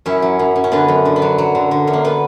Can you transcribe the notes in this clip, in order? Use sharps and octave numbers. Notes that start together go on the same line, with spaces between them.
F#2 C#4 E4
F#3
F#2
F#2
C#4
D3 B3 D4
F#2
D3
B3
F#3
F#3
D3
D3
F#2
A#3
B3